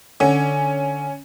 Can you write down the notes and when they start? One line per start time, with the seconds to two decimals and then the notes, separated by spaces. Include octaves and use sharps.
0.20 D3 C#4